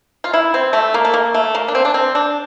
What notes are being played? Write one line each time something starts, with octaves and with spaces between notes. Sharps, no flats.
F4
E4
C4
A3
A#3
A3
A#3
A3
A#3
D4
C4
D4
C4
D4